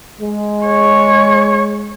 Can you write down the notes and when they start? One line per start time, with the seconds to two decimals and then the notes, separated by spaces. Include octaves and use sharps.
0.20 G#3
0.66 C#5